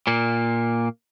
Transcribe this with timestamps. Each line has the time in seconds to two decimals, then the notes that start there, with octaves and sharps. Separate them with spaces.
0.07 A#2 A#3